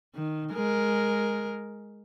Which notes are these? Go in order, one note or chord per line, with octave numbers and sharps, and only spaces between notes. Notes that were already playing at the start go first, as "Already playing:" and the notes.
D#3
G#3 A#4